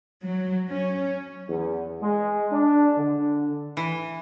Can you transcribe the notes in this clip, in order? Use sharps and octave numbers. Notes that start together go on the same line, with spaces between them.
F#3
C#4
E2
G#3
D4
D3
E3